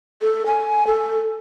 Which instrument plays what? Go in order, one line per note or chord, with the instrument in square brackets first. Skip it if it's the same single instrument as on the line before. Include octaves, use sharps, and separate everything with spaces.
[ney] A4
G#5
A4